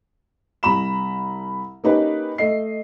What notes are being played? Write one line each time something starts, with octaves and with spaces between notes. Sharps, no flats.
C2 A#5 B5 E7
A#3 C#4 D#4 G4 B4
A3 D#5 C7